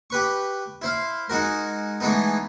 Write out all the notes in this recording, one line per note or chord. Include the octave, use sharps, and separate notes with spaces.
G4 B4 C#6
E4 C5 F5
G#3 D#4 F#4 A#4
E3 G#3 A3 B3 D#4